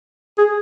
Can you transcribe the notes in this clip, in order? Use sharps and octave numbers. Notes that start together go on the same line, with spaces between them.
G#4